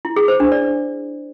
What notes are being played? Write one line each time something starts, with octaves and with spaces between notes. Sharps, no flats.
E4
G#4
C5
D4
D5